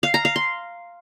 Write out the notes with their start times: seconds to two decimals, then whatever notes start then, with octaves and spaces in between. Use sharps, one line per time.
0.03 F5
0.14 A#5
0.25 F5
0.36 C6